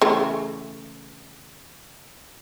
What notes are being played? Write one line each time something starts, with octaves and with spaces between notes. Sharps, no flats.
C#3 E3 A3